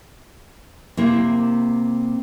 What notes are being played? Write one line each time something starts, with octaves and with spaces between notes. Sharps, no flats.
C3 A#3 E4